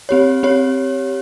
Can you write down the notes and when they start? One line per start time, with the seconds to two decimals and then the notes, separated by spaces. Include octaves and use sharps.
0.09 C4 G4 C#5
0.43 C4 G4 C#5